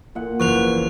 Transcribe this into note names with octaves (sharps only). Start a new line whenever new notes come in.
A#2 F#5
F#1 E2 F3 C#6 F#6 F7